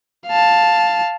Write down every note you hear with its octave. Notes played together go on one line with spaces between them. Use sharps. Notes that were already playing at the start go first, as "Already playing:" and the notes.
F5 A5